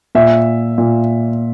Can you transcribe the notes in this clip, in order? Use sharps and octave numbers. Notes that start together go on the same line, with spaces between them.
A#2 E5
A#2